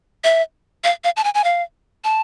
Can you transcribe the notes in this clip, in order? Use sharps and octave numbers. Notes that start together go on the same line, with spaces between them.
E5
F5
F5
A5
G#5
G#5
F5
A5